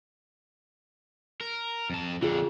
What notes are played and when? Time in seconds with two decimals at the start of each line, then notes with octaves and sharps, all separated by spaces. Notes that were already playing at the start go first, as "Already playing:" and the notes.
1.41 A#4
1.90 F2 A5
2.23 F2 D3 F4 G#4